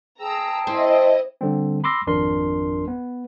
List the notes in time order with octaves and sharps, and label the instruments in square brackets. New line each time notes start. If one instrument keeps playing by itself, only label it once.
[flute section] G#4 G5 A5 [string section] A#5 E6
[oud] C4 [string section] E4 D#5
[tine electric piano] D3 G3 C4
B5 C6 D6 E6 A#6
G#1 F2 D4 A#4 C6
B3